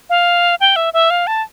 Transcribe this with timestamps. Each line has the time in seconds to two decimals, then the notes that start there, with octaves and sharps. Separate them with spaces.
0.10 F5
0.60 G5
0.76 E5
0.94 E5
1.10 F5
1.27 A5